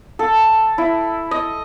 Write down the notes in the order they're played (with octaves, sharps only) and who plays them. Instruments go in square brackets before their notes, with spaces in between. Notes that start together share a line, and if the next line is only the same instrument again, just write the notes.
[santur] A4
E4
D#5